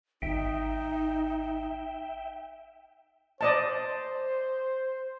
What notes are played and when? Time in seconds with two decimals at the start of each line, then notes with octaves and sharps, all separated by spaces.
0.22 G#1 D#4 E5 G5
3.41 C5 D5 D#5 A5